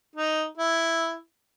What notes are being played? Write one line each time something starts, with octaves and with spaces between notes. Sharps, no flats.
D#4
E4